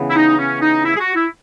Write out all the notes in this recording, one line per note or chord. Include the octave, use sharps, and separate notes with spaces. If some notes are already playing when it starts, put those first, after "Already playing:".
Already playing: C#3 E3 B3
E4
D#4
C#4
D#4
E4
G#4
F#4
E4